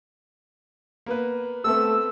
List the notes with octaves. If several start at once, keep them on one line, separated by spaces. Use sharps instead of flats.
A#3 B3 B4
A3 B3 C4 A4 E6